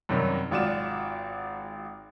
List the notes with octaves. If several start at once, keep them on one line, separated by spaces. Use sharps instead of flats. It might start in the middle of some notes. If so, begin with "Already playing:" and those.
F#2 C3 D#3 F#3 G3
G#1 F4 F#4 D5 E7